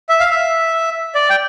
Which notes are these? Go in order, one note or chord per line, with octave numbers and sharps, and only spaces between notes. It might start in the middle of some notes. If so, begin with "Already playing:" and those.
E5
F5
E5
D5
G5